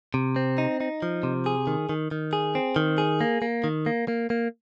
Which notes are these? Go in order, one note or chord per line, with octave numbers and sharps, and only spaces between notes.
C3
C4
D#4
D#4
F3
C3
G#4
D#3
D#3
D#3
G#4
C4
D#3
G#4
A#3
A#3
D#3
A#3
A#3
A#3